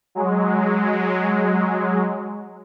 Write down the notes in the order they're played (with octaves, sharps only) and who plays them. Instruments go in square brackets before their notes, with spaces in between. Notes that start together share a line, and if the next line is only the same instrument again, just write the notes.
[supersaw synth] F#3 G#3